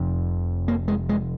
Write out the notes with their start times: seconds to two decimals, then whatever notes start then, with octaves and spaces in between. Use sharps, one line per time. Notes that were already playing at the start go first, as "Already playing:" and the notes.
Already playing: F1 F2 C3
0.68 A#3
0.88 G#3
1.09 G#3